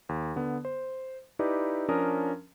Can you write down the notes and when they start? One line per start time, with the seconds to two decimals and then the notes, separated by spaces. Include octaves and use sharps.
0.09 D#2
0.36 D3 B3
0.65 C5
1.39 D#4 E4 G4 B4 D5
1.88 F3 C#4 D4 A#4 A#5 D#6